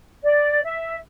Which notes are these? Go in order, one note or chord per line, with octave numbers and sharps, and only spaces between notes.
D5
E5